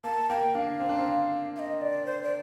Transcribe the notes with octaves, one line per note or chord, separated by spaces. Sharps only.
A#3 A5
A#3 G5
D4 F5
C4
D4
C4
F5
D#5
D5
C5
D5